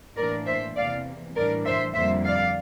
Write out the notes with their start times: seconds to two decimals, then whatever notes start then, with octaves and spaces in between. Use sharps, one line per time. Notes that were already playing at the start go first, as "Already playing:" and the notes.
0.17 A2 E3 A#3 D4 A#4 D5
0.46 C5 E5
0.76 E2 C3 E3 A#3 D5 F5
1.35 A2 E3 G3 D4 A#4 D5
1.65 C5 E5
1.94 F2 D3 G3 A#3 C5 E5
2.24 D5 F5